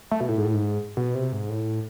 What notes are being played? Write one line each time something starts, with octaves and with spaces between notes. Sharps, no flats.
A3
B2
A2
G#2
A2
G#2
B2
C3
G#2
A2